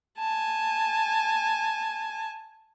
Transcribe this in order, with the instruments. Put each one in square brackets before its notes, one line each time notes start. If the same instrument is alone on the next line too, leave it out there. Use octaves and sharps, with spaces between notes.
[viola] G#5 A5